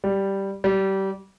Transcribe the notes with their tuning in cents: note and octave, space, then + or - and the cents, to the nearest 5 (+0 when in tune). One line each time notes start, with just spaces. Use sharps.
G3 -5
G3 -25